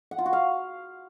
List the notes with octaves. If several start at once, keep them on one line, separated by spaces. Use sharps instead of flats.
F#5
F4
F#4
F5